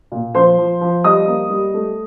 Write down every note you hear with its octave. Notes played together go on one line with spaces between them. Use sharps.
A#2
F3 C5 C6
F3
F3
G3 D#5 D#6
A#3
G3
A3